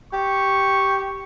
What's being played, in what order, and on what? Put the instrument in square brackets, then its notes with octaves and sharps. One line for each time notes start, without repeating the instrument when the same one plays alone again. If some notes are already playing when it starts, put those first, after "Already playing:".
[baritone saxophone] G4 [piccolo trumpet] C#6